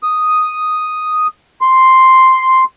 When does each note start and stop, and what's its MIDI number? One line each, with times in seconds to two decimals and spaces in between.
0.03 1.27 87
1.61 2.64 84